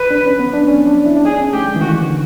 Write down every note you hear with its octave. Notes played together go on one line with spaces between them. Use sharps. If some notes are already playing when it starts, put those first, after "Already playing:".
Already playing: B4
D4
C#4
B3
D4
C#4
D4
E4
D4
D#4 G#4
C#4
A3 G4
G#3
E3
D#3 F#4
D3